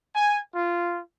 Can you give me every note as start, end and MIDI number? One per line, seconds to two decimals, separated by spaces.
0.15 0.41 80
0.56 1.01 65